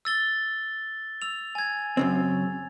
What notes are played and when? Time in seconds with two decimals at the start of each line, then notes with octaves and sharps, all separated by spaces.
0.05 E6 A6 G7
1.22 E6 F7
1.55 G#5 G#6
1.97 F#2 C#3 C4